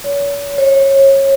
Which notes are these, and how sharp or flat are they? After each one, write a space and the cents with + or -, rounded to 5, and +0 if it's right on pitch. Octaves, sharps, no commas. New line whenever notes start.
C#5 +40
C#5 -25